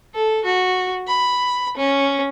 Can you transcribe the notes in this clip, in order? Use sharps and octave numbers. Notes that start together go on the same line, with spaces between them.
A4
F#4
B5
C#4